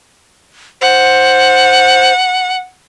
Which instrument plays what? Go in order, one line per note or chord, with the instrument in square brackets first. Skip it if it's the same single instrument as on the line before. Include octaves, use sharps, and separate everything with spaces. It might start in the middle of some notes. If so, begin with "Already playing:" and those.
[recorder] C5 [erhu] F#5